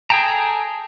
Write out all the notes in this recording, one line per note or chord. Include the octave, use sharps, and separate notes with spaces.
G#4 A4 G5 A5 A#5